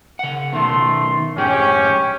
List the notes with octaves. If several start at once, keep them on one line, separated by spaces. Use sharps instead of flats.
C#3 F#5
B2 D#3 A3 C6
F2 G#2 C#4 G4 G#4 G5